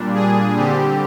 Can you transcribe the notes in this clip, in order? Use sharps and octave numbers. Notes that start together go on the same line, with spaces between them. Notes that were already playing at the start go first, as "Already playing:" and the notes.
Already playing: A#2 G3 D4
G#4
D3 G3 C4 G4